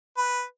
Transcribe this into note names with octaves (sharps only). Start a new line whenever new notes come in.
B4